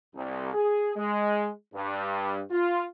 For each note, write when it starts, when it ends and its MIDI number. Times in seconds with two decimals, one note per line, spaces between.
0.15 0.53 36
0.54 0.91 68
0.96 1.49 56
1.74 2.40 43
2.51 2.84 65